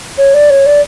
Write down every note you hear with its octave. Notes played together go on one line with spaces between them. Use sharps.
C#5
D5
C#5
D5